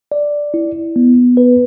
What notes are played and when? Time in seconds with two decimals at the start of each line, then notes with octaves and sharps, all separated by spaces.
0.12 D5
0.54 E4
0.96 B3
1.37 B4